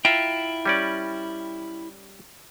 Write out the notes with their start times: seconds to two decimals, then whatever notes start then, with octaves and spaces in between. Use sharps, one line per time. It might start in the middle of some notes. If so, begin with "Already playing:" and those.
0.05 E4 F4 E5 G5 A#5
0.65 G3 C#4 D5